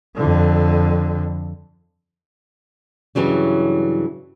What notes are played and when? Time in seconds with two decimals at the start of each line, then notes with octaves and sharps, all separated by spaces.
0.16 F2 D3
3.15 G2 C#3 E3 F#3 G3